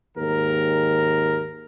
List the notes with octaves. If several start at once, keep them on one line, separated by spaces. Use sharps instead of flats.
D#2 G#2 A#4